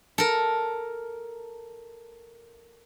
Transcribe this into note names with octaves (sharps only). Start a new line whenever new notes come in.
A4 A#4